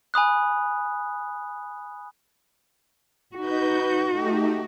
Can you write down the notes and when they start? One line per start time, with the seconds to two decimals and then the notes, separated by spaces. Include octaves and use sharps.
0.14 G#5 B5 D#6 F#6
3.36 D#4 F#4 B4 G6
4.09 A3 D#4 G4